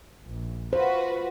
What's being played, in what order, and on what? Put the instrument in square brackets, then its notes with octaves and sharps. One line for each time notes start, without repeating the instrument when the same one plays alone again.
[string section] A#1
[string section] F4 F#4 B4 [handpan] C5